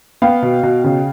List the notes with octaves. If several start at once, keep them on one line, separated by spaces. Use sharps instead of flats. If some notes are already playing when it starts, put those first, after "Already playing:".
B3 F5 G5
B2
B2
C#3